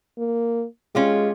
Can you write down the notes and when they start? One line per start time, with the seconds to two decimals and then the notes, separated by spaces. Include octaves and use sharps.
0.18 A#3
0.95 G#3 C#4 F4 G4